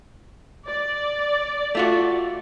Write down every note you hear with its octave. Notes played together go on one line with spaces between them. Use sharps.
D5
A3 F4 F#4